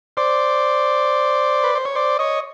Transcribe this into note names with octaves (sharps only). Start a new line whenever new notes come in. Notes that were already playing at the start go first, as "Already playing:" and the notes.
C5 D5
B4
C5
C#5
C5 D5
C#5 D#5